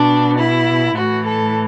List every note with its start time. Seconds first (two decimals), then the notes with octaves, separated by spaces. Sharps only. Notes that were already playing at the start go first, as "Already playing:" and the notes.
Already playing: B2 D4
0.38 E4
0.96 A2 E3 F#4
1.26 A4